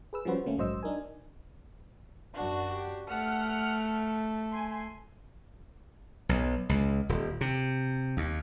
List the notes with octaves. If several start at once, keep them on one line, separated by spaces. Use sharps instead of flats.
G#4 B4 E6
F3 G3 C#4 F#4 B4 C5
C#3 A3 A#3 C#4
A#1 G#2 F#3 C5 D#5 E6
D4 D#4 A#4 G#5
F#2 D4 F#4
G4
A3 F#5 F6 C#7
G#5 C6
B1
C#2
D#1
C3
D#2